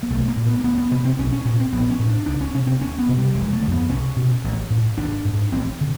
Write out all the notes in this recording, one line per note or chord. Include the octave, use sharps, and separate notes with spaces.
A#3
B1 A3
A#3
A#2
B3
A#3
D2 B3
B3
C3 B3
C4
B1 C#4
C#4
A#2 C#4
C4
A#1 B3
C#4
A2
D4
C#2 D4
C#4
C3 C#4
C4
D2 C#4
B3
C3
G3
F1 G#3
A3
D3
F2 B3
C2 C#4
B2
A1
A2
G#1 D4
G#2
A1 C4
D3